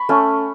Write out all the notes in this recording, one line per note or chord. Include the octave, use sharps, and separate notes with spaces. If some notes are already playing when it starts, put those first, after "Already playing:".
Already playing: B5 C#6
A3 C#4